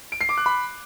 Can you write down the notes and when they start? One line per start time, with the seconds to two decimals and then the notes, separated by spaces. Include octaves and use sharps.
0.12 D7
0.21 C7
0.29 D6
0.37 F#6
0.46 B5